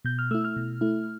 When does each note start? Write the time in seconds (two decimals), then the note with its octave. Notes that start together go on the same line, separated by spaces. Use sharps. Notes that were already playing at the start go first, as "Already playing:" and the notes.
0.05 B2 G6
0.19 F6
0.31 A3 E4 E6
0.44 F6
0.56 B2
0.81 A3 E4